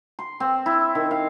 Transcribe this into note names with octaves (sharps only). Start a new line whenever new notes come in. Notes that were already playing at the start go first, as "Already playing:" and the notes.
C6
C4
E4
D#3
F5